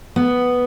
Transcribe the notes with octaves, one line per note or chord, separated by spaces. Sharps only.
B3